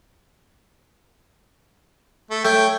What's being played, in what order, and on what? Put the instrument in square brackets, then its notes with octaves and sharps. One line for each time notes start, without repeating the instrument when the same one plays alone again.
[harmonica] A3
[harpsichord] A3 [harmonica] C#5 G5